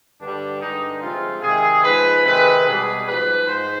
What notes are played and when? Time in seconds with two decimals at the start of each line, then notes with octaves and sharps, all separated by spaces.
0.20 G2 D3 G3 D4
0.61 G2 D3 G#3 D#4
1.02 C3 F3 G#3 F4
1.43 C3 D#3 G#3 G#4
1.84 G#2 F3 G#3 B4
2.25 C3 D#3 G#3 B4
2.66 B2 G3 G#4
3.06 G#2 F3 G#3 B4
3.47 G#2 C5